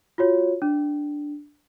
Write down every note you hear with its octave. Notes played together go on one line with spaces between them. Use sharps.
F4 F#4 C#5
D4